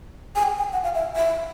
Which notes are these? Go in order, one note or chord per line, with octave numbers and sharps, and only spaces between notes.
G#5
G5
G#5
F#5
F5
E5
E5